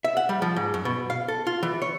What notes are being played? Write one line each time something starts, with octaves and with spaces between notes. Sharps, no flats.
E5
F#5
G3
F3
G#2
F#2
B2
F5
A4
F4
E3
C#5